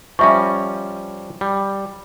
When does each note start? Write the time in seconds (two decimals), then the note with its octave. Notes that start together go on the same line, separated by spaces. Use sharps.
0.19 F3 G3 C#4 E5 C#6
1.41 G3